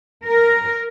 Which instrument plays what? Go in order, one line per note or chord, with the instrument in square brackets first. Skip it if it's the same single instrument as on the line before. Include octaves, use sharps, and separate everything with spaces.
[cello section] A#4